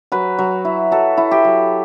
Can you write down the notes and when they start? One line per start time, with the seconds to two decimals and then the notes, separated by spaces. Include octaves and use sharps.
0.12 F#3 B4
0.39 F#3
0.65 E4
0.92 F#3 A4
1.17 E4
1.31 G4
1.45 F#3